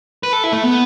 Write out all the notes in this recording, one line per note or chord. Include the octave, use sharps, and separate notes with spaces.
B4
A4
E4
A3
B3